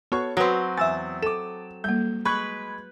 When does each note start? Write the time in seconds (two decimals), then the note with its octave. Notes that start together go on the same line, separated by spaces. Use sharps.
0.12 B3 F#4 A4 C#5 C#6
0.37 F#3 C4 F#4 B4 D#6 A#6 D7
0.78 E2 E5 G#5 E6 A6
1.22 A4 D6 E7
1.84 G3 A#3 G6
2.25 G#3 B4 B5 C#6 F#6 G#6